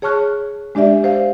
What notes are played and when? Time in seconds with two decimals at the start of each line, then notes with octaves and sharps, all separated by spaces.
0.02 G#4 C#5 A5 C#6 F6 F#6
0.75 G#3 D4 G4 D5 E5
1.03 G4 C5 F5